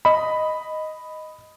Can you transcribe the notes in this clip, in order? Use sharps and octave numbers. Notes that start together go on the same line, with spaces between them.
D#5 B5